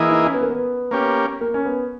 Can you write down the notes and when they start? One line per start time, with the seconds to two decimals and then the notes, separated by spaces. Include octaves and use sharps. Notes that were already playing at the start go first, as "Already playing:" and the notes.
Already playing: E3 A#3 E4 G#4 D#5
0.09 D#4
0.26 C#4
0.34 B3
0.42 A#3
0.50 B3
0.91 A#3 C#4 G4
1.41 A#3
1.54 C#4
1.65 B3